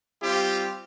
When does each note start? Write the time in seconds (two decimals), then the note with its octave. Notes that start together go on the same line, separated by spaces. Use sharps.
0.23 G3 C4 F4 G4